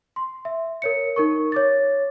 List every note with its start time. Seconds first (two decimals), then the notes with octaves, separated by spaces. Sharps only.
0.16 C6
0.45 E5
0.82 A#4 C#5 C#7
1.16 D#4 A#4 C#6
1.52 C#5 D6 A6